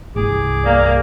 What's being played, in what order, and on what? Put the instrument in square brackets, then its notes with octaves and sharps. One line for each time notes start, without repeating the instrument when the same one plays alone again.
[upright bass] C2 G2 [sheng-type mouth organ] G#4 D6
[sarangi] A#3 [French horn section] D5